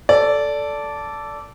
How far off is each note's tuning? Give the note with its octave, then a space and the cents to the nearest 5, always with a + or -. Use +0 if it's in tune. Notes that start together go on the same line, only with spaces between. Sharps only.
A4 +0 D5 -15